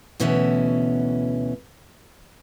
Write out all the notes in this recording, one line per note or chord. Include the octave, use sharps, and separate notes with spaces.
D2 B2 E3 C#4 E5